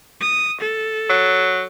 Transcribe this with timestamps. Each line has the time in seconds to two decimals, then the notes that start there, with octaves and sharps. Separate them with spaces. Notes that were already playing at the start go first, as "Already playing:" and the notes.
0.21 D#6
0.60 A4
1.10 F#3